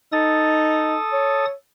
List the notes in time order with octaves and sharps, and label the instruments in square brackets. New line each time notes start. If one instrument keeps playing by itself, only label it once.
[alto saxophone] D#4 [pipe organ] A4 D#6 A6
[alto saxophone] C#5